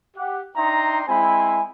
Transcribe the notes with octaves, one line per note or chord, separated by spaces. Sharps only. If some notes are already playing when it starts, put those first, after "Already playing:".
G4 F#5
D4 D#4 E5 G5 A#5 C6
G#3 C4 E4 C5 G#5 B5